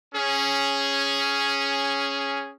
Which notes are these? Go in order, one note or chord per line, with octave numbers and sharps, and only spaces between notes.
C#4 G#4